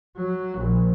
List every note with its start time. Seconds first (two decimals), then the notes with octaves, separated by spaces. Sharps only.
0.17 F#3
0.57 A#1